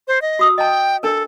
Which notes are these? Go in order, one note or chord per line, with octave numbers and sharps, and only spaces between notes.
C5
D#5
F#4 D#6 E6
D#5 G5 A5
D4 A4 A#4